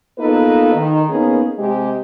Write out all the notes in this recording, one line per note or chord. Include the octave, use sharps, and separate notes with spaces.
A#3 B3 D#4 F4 A4 B4
D#3
A#3 B3 C#4 D#4 G#4 A#4
C3 G#3 G4